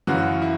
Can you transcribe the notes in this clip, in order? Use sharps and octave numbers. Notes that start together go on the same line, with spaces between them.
F#2 C#3 E3 F#4
E4